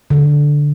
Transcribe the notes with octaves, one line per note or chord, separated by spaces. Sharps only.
D3